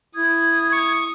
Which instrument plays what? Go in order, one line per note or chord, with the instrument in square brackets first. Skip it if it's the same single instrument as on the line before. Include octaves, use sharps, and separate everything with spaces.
[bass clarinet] E4 [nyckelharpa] D#6 [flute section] G#6
[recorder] C#6